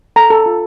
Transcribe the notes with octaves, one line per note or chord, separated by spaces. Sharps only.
A4 A#5
A4
F4